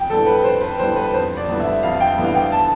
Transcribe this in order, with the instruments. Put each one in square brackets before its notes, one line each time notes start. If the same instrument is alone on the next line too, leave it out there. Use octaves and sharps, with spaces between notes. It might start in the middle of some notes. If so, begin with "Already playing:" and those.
Already playing: [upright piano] F2 [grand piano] G5
[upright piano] D3 G3 B3 E4 [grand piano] A4
[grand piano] B4
[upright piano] F2 [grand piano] C5
[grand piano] B4
[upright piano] D3 G3 B3 E4 [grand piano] C5
[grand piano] B4
[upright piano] F2 [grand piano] C5
[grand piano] D5
[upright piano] D3 G3 B3 E4
[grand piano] E5
[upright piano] F2 [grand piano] F5
[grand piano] G5
[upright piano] D3 G3 B3 E4
[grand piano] F5
G5
A5